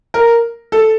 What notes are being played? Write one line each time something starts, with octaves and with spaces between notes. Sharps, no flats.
A#4
A4